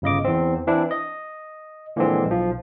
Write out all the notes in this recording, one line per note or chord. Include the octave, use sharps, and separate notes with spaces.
G1 C#3 D#5 D6
E2 C4
E3 C4 D4 E4
D#5
A#2 D3 E3 F3 G#3 C4
B1 F3